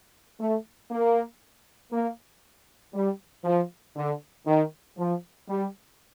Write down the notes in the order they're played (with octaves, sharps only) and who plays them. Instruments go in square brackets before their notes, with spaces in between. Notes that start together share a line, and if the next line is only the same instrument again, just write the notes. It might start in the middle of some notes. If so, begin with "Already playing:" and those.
[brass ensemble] A3
A#3
A#3
G3
F3
D3
D#3
F3
G3